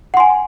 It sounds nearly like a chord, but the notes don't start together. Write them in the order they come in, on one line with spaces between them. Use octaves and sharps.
F#5 C6 G#5